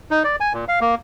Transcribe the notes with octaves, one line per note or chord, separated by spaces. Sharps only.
D#4
D5
G#5
A#2
F5
A#3